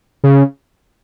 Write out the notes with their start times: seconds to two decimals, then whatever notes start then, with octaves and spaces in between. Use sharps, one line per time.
0.24 C#3